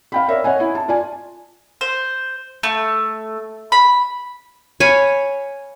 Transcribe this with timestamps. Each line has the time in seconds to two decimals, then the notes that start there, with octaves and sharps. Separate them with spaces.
0.12 F5 G5 B5
0.28 A#4 C#5 D5 E5
0.44 C#5 D#5 F#5 G#5
0.60 E4
0.75 A5
0.88 F4 D5 G#5
1.81 C5
2.63 A3
3.72 B5
4.80 C#5 F5 G#5 B5